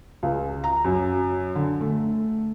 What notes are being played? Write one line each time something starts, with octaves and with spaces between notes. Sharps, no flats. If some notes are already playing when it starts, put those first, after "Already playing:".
C#2
A#5
F#2
D3
A3